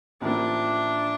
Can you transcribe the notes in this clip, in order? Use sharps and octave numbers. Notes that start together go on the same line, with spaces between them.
A1 A2 F3 A#3 D4